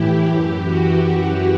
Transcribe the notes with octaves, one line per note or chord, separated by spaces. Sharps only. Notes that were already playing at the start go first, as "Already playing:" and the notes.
Already playing: A2 E3 E4 G4
F#2 E3
F#4
F#4